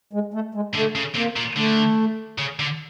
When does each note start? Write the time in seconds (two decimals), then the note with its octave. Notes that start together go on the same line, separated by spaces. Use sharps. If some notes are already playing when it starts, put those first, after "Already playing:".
0.13 G#3
0.34 A3
0.55 G#3
0.74 D3 A3
0.96 C#3
1.15 C3 A#3
1.36 A#2
1.56 D3 A3
2.38 C#3
2.59 D3